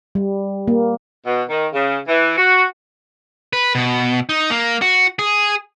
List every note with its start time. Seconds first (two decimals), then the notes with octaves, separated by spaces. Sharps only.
0.15 G3
0.68 A#3
1.25 B2
1.49 D#3
1.73 C#3
2.07 E3
2.38 F#4
3.53 B4
3.75 B2
4.29 D#4
4.50 A#3
4.82 F#4
5.19 G#4